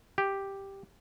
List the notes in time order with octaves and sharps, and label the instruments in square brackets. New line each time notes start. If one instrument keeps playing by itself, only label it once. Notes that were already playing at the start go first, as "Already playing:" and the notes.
[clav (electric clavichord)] G4